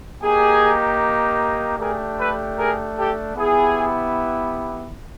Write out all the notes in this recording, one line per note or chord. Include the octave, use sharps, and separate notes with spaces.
A#3 D#4 G4 G#4
A3 D4 G4 G#4 A#4
A4 B4
G#4 A#4
G4 A4
B3 E4 G4 G#4